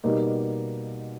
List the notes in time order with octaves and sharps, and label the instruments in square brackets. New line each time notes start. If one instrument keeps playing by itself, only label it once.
[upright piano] B2 G3 A#3 D#4